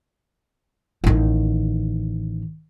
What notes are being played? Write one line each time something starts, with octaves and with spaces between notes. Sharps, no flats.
A1 D#3